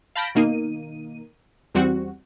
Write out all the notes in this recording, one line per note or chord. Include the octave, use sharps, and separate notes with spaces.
F5 A5 B5 G6 A#6 D7
B2 D#3 A#3 D#4 D#7
E2 G3 C4 F#4